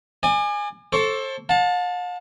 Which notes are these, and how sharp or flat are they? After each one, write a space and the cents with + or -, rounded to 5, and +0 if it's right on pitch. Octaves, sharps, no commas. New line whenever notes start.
D5 +40 G#5 -10
A4 +0 C5 +35 C#6 +40
F5 +45 A5 +0